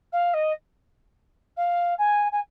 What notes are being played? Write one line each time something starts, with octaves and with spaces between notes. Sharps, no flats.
F5
D#5
F5
G#5
G#5